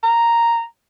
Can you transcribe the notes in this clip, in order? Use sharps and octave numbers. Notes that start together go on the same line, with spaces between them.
A#5